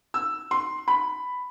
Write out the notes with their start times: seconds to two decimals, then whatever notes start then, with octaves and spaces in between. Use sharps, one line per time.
0.14 E6
0.51 C6
0.88 B5